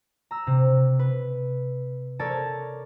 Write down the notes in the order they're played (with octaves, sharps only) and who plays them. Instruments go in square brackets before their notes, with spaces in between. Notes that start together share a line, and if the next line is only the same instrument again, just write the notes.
[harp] A#5 E6
C3
B4
A4 A#4 C#5 D5 A5